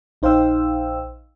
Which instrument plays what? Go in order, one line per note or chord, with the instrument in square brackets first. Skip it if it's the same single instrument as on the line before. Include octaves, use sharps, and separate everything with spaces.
[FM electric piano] A#1 D#4 C5 F5 G5 E6